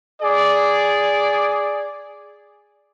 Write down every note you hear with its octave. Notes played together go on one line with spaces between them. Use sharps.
G#4 D5